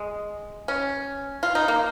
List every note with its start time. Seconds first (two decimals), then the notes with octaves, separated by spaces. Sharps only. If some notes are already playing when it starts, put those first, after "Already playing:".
Already playing: G#3
0.68 C#4
1.43 F4
1.55 D#4
1.68 A#3